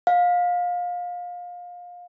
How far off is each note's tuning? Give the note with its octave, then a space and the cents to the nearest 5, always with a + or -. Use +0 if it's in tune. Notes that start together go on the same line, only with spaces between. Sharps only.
F5 +25